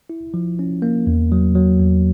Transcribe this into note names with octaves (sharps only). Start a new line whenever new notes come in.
E4
F3
C#4
A#3
E2
F#3
F#3
E2